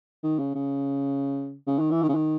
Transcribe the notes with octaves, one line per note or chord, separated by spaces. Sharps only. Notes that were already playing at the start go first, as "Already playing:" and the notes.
D#3
C#3
C#3
C#3
D#3
E3
D#3
C#3
D#3